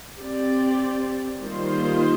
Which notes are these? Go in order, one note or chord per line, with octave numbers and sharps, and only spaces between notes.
C4 G4 D5
D#3 G3 A#3 F4 C5